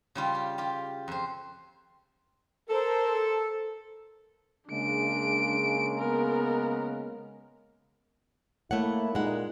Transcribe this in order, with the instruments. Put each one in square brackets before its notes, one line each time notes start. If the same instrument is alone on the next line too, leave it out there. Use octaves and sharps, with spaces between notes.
[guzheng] C#3 G3 F4
G4
F4 G4
F2 C5
[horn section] A4 [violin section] A#4 C5
[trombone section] C#3 G#3 A#3 [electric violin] D4 D7
[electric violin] B3 A#4
[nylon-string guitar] A3 C#5 F#5 [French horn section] A#3 E4
[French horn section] A#2 D#4 [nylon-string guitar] G#3 F#5